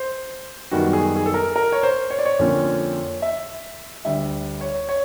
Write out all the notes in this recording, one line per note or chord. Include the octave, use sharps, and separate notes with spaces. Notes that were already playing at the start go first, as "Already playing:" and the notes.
Already playing: C5
F#2 D#3 G3 B3 F#4
G#4
G#4
A4
A#4
A#4
C#5
C5
C#5
D5
C#5
F2 D3 F3 A#3 C#4
E5
D2 D3 G3 E5
C#5
C#5